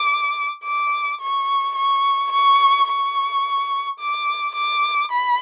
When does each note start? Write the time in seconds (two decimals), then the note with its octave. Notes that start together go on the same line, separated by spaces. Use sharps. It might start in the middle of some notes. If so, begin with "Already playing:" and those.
Already playing: D6
0.64 D6
1.20 C#6
1.76 C#6
2.32 C#6
2.88 C#6
3.99 D6
4.55 D6
5.12 B5